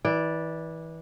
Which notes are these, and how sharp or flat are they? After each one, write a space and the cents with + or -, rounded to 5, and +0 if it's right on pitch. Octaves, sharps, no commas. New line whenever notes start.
E3 -25 D5 +0